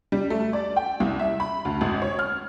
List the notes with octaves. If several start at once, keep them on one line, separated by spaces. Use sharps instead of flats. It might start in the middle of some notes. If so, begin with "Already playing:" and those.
G3
A3
D5
G5
C2
E5
B5
D2
G#1
C#5
F6